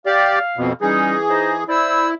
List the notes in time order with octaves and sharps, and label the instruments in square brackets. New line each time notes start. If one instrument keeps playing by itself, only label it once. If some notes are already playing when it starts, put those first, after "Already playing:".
[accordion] G4 D5 [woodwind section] F5
[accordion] F2 B2
[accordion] E3 G#4 [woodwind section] G3 C#4 D#4
[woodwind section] D#4 C5 D#5
[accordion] E4 [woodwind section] C5 D5 E6